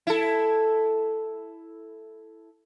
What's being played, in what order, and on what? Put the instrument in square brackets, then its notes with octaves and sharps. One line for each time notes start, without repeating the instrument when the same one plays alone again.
[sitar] E4 A4